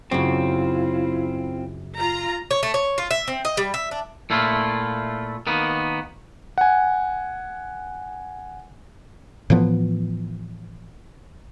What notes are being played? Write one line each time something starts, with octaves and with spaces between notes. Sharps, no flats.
F#2 C#3 C4 E4 F4
F4 A#5
C#5
A3
C#5
F4
E5
C4
D#5
G3
E5
D4
A#2 A3 E4 F4
D#3 A#3 B3
F#5 G#5
A2 E3 F3 B3